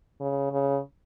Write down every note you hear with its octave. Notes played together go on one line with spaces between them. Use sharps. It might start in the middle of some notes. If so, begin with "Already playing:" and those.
C#3
C#3